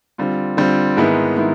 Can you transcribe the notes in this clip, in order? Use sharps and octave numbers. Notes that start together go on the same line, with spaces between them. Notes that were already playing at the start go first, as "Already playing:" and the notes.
D3 G3 C4 F4
D3 G3 C4 F4
G#2 D#3 G#3 B3 E4
D#3 G#3 B3 E4